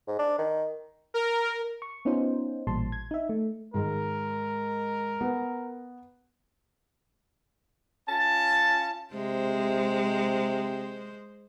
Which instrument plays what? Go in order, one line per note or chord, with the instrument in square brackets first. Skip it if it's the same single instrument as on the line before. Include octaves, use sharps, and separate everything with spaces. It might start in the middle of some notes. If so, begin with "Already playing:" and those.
[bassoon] G#2
D4
D#3
[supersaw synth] A#4
[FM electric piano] C#6
B3 C#4 D#4 F4 C5
A1 A#2 G3 A5 C6
G#6
D#4 E5
A3
[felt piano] G#2 D#3 G#3 [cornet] A#4
[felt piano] B3
[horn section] C#4 F4 A5
[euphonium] C3 [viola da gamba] G#3 C5